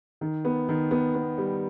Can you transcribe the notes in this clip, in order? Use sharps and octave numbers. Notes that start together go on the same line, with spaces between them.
D#3
B3
D#3
B3
B3
G3